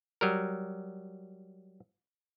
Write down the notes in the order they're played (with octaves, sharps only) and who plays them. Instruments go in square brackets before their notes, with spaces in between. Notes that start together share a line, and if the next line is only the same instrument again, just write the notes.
[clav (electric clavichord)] F#3 G3 A#4